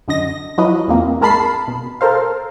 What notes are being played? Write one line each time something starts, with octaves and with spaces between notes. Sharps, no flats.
F#2 D3 D#5 A#6
F3 F#3 E4 B4 D#5
E2 A#2 A#3 C4
G#1 G#3 A#4 A5 B5 C7
B2
A4 A#4 C5 F5